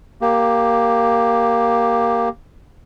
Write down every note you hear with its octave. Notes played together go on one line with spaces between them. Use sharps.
A#3 G4